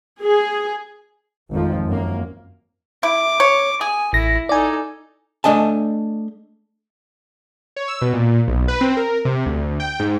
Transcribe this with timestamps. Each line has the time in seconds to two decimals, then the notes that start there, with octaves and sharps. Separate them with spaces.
0.23 G#4
1.52 G#1 F2 F3
1.88 F#2 A#3
3.03 E4 D6
3.40 C#5
3.81 G#4 G#5
4.13 A1 E4 A#6
4.49 D#4 A4 D5 G#5
5.44 A3 D4 D#5 G#5 A5
7.76 C#5
7.88 E6
8.02 B2
8.13 A#2
8.48 B1
8.68 B4
8.81 C4
8.97 A#4
9.25 C3
9.46 D2
9.80 G5
10.00 G#2